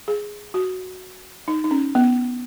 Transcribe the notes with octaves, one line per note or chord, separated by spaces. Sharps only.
G#4
F#4
D#4
D#4
C#4
B3